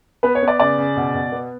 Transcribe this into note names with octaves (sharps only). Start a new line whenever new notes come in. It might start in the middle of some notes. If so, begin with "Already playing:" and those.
B3 B4
C#5
B3
D5
C#3 D5
C#3
B2
B2
B3